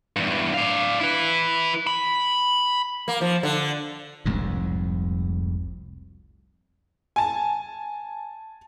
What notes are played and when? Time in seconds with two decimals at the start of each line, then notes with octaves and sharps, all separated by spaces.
0.16 E2 G2
0.54 D4 F5
1.00 E4 B4
1.87 B5
3.08 A#3
3.21 F3
3.43 D3
4.25 F1 C2 F2 G#2
7.16 G#5 A5